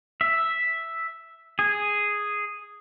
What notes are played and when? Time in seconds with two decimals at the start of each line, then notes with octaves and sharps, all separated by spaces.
0.21 E5
1.59 G#4